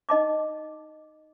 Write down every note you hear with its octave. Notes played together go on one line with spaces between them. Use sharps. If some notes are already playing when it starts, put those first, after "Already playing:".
D#4 D#5 A5 D6